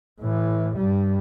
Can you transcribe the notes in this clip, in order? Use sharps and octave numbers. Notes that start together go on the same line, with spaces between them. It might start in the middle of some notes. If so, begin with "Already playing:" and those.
A2 E3
G2 G3